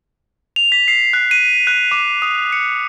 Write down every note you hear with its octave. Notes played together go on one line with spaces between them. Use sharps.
F7
B6
C7
F#6
D#7
F#6
D6
D#6
C#7